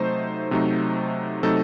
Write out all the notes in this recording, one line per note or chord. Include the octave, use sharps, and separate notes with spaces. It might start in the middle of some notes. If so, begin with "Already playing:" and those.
Already playing: C3 F#3 A3 D#4 C5
C3 F#3 A3 D#4
C3 F#3 A3 D#4 A4